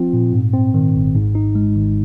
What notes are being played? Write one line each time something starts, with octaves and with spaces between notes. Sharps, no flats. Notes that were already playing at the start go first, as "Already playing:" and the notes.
Already playing: F3 C4 F4
A#2
G#2
C4
D#3
G#1
G#2
D#4
G#3
G#1